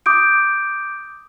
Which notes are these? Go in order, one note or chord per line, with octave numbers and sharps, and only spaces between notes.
D6 D#6 G6 D7